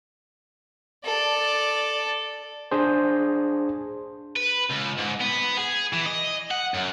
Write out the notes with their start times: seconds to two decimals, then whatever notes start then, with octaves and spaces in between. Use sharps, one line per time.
1.05 A4 D5
2.71 D4 G#4 C5
4.36 B4
4.70 C#2
4.98 G#2
5.20 B3
5.58 G#4
5.93 E3
6.06 D#5
6.51 F#5
6.74 F#2